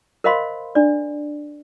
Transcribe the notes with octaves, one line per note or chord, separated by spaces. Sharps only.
A#4 C5 D#5 F5 B5 C6
D4 D5